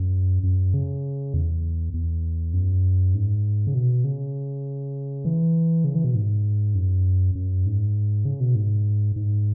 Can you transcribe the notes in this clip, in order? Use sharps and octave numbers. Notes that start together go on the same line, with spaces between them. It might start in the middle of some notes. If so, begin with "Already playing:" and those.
Already playing: F#2
F#2
C#3
E2
E2
F#2
G#2
C#3
B2
C#3
E3
C#3
E3
B2
G#2
F#2
F#2
G#2
C#3
B2
G#2
G#2